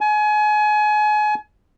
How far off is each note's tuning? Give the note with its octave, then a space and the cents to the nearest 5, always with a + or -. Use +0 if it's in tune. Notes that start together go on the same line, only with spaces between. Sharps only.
G#5 +30